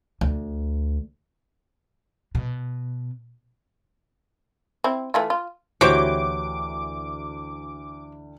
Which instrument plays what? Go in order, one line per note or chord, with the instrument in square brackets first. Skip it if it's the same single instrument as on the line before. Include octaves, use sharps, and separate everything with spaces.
[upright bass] D2
B2
[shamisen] C4 E4
E3 A3 F4
F4
[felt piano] D2 [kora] E3 F#4 G5 [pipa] G4 C5 C#5 [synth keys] D6